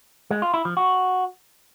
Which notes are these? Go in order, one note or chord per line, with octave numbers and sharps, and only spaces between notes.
G#3
F4
E4
F3
F#4